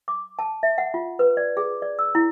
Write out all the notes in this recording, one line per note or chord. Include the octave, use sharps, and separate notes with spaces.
D6
A5
E5
F#5
F4
B4
D5
G#4
D5
E6
E4